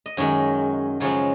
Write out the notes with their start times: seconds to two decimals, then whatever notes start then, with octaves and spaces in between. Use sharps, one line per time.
0.06 D#5
0.17 F#2 D#3 G#3 C#5
1.00 F#2 C#3 F3 G#3 C#5